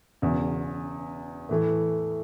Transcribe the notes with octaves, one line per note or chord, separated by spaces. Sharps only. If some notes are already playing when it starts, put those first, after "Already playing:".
E1 E2 C#3
A2 E3 A3